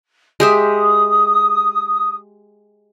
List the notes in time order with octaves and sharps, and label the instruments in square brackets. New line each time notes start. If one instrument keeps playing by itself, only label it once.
[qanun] G#3 G4 E5 [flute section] D#6